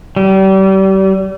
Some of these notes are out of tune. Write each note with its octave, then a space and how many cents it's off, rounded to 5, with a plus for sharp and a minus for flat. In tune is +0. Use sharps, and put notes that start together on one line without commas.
G3 -35